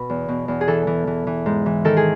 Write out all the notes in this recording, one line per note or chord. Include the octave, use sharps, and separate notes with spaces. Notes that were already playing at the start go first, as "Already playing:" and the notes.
Already playing: B2 B4
E2
B2
E2
G#4
E3 A4
E3
E3
E3
G#2
E3
D#3 A4
G#4